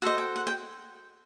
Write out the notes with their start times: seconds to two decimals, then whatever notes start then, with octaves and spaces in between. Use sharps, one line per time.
0.02 F#4 A4 C5 D#5 F#5
0.18 G5
0.36 F#5
0.47 G5